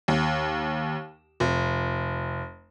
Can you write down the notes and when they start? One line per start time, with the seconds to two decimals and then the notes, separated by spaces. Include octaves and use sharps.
0.08 D#2
1.40 F1